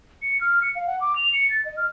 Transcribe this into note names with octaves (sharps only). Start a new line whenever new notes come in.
C#7
F6
C#7
F5
F#5
D6
F7
C#7
A6
D#5
F6